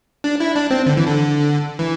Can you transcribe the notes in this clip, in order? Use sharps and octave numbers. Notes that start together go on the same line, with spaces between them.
D4
E4
D4
C4
D3
E3
D3
E3